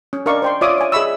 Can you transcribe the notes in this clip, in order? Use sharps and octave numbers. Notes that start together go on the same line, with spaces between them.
C#4
D4 A#4 D5 D#5 F5 C#6
C5 G5 C6
F4 C#5 D5 E5 D6 D#6
C#5 G#5
G#4 D#5 E5 B5 C#6 E6